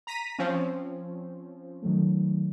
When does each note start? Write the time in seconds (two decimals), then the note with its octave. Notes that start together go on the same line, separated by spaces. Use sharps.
0.07 A#5 B6 D#7
0.39 F3 C4 C#4
1.83 D#3 F#3 A3